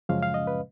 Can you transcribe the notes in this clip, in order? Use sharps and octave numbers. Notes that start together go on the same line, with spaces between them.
F#2 C#3 F3 G#3 C#4 F5
F5
D#5
B4